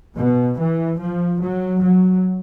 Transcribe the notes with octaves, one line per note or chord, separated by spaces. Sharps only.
B2
E3
F3
F#3
F#3